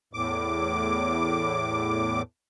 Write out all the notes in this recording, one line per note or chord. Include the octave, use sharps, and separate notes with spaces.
E2 A2 D6